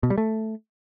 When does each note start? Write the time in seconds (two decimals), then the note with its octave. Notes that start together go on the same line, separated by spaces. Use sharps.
0.03 B2
0.10 G3
0.18 A3